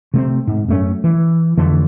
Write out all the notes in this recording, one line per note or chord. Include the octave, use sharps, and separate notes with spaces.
C3 A3 A#3 C4
G#2
F#2 A3 C#4
E3
F2 D3 E3 A3